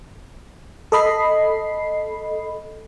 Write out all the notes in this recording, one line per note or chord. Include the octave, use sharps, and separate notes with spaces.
A4 D#5 B5 C7